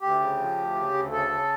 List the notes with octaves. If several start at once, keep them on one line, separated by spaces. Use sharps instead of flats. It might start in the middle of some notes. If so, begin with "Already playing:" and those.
D2 G4
C#3
F3
D2
C#3
D2
C#3 A4
C#3